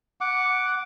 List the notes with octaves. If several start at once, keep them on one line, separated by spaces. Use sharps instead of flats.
F#5 D6